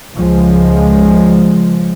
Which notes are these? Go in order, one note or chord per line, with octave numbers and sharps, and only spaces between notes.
C#2 F3 G#3